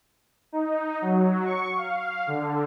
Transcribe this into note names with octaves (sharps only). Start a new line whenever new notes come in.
D#4
F#3
C#6
F5
D3